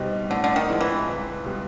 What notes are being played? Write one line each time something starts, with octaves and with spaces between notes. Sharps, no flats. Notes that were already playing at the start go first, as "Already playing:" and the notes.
Already playing: C2 B2 G3 C4 D#4
A2 D3
D3
D#3
F3 G#3 C4 E4
E3
C#2
B2 G3 B3